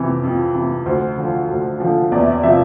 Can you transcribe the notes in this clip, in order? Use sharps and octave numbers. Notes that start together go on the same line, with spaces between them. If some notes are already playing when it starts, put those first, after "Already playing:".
Already playing: F2 C3 E3
F2
C3 E3
D2 C5
D3 F3
D2
D3 F3
E2 D5
E5
D5
C3 F3 E5